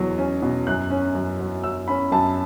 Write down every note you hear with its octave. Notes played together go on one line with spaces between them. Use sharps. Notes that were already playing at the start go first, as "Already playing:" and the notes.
Already playing: E2 B2 F#3
C#4
B2
F#2 F#6
C#4
F#2
F#3
F#2 E6
C#4 B5
F#2 A5